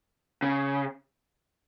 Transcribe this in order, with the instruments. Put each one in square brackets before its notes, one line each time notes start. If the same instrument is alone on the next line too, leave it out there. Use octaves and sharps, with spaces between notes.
[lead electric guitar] C#3